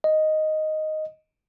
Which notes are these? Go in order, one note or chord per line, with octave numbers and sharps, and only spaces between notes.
D#5